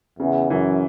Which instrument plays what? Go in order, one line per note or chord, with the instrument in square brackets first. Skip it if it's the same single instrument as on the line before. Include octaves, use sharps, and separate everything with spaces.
[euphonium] E2 [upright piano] C#3
[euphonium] F#2 [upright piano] E3